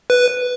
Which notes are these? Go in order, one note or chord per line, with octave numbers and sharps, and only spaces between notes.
B4